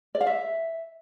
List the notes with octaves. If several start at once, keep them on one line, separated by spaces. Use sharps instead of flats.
D5
F5
E5